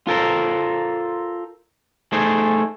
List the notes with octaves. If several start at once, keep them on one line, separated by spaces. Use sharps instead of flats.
F4 A4 A#4 C5
A3 D#4 G#4 C5